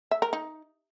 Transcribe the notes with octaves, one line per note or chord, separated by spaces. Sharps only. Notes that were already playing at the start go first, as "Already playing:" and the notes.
E5
A#4
D#4